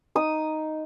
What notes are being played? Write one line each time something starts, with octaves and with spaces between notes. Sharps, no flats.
D#4 D#6